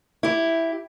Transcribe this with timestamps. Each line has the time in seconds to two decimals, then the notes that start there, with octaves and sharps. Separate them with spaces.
0.23 E4 G4